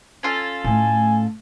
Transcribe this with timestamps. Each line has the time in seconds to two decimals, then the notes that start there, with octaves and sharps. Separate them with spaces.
0.23 C#4 F4 A4
0.64 A2 A3 G#5